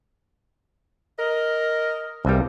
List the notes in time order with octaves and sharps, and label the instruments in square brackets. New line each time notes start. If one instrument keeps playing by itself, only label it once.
[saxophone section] A#4 D#5
[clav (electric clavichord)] C2 G3 [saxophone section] E3 G#3 A#3